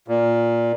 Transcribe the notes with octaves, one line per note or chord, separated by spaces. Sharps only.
A#2